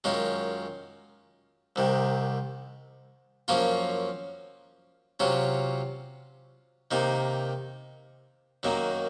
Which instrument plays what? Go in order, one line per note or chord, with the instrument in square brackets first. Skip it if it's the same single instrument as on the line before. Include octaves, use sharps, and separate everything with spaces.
[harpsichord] F#2 D#3 G#3 C#4 F4
C2 C3 D#3
F#2 F3 A#3 C#4 F4
C3 F#3 C#4 F4
C3 D#3 A#3 D#4
F#2 D#3 F#3 A#3